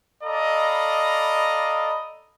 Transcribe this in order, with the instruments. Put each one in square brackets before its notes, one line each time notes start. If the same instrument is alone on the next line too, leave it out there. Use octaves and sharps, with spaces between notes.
[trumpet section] A4 D5 D#5 F5 A#5 B5